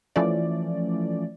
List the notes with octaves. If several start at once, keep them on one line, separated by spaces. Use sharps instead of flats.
E3 F3 A3 C#4 D5